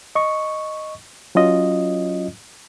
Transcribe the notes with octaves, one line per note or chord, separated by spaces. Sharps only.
D#5 C#6
F#3 C#4 F4 D#5